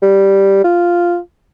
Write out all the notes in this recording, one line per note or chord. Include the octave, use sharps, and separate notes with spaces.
G3
F4